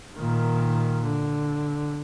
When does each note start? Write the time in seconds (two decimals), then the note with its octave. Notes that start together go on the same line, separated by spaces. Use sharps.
0.17 A#2 D#3
1.05 D3